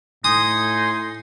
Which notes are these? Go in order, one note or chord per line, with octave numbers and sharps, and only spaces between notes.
A2 D#4 G#5 C6 D#6